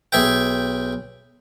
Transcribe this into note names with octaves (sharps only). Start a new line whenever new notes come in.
B1 G#4 E5 G5